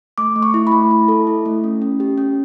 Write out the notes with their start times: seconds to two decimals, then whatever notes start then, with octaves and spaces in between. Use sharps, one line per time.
0.18 A3 D6
0.36 A3
0.43 C#6
0.54 E4
0.67 B5
0.72 A3
0.91 E4
1.08 A4
1.27 E4
1.46 A3
1.64 C#4
1.82 C#4
2.00 G4
2.18 C#4